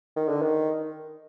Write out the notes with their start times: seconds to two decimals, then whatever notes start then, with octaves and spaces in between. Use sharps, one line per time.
0.16 D#3
0.29 D3
0.42 D#3